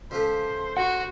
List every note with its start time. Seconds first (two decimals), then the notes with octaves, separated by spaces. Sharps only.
0.11 C#2 F3 A3 C5
0.77 F#4 F#5